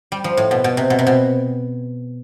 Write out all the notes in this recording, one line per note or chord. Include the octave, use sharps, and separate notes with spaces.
G3
F3
A2
B2
B2
C3
B2
C3
B2